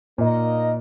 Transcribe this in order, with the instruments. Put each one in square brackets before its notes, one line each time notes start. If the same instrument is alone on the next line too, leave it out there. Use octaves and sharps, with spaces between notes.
[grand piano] A#2 [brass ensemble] A#3 D#4 A#4 D#5